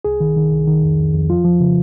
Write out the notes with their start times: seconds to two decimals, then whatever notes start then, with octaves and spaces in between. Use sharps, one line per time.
0.05 C2 G#4
0.20 D#3
0.36 D#3
0.52 C2
0.67 D#3
0.83 F2
0.99 F2
1.14 F2
1.29 F3 F4
1.44 F3
1.60 C#3